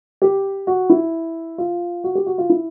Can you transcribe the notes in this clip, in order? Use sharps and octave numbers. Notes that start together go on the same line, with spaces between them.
G4
F#4
E4
F4
F#4
G4
F#4
F4
E4